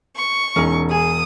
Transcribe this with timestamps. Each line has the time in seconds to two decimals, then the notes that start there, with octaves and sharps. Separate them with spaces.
0.16 C#6
0.56 E1 C#4 D#4
0.91 G#4 D#6